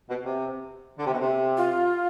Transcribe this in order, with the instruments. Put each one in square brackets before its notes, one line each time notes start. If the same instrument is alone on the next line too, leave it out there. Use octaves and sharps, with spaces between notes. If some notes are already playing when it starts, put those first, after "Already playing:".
[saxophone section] B2
C3
D3
C3
B2
C3
[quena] F4